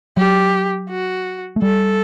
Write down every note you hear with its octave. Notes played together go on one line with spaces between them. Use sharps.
F#3 G4
F#4
A3
G3 A4